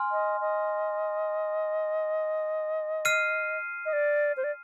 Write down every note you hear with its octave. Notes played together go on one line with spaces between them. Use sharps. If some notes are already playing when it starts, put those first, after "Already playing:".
Already playing: G#5 C6 F6
D#5
D#5
F6 C7 D#7
D#5
D5
C5
D5